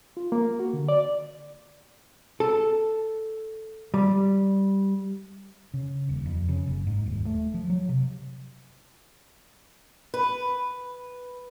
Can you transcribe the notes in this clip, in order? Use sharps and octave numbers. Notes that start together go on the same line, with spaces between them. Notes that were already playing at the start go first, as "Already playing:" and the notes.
F4
A#3
F#4
D3
D5
A4
G3
C#3
D#1
F2
C#3
F#1
G#2
D#1
A3
F3
F#3
C3
B4